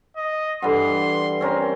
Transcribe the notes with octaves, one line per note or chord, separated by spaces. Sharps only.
D#5
G2 E3 A4 F#5 C6
C4 C#4 A#4